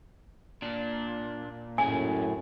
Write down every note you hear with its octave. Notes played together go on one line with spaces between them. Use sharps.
A#2 D4
F#2 A2 A3 C#4 G#4 G#5